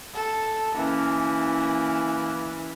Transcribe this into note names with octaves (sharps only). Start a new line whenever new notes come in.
A4
E3 A#3 C#4